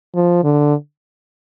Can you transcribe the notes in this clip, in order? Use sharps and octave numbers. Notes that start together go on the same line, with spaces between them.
F3
D3